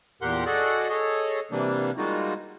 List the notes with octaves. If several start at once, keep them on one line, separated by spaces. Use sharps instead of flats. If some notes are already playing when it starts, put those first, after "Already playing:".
E2 A#2 G4 A#4 F#5 C6
F#4 G#4 A4 D5 D#5 F#5
G#4 A4 C#5 D#5
C3 E3 G3 A#3 D4
G3 G#3 A#3 D#4 F4 F#4